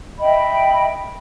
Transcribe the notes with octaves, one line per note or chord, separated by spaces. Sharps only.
D#5 E5 G5 B5